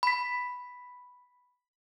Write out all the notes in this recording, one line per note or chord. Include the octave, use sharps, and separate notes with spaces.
B5 B6